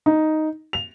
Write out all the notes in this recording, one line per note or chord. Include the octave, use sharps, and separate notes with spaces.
D#4
F7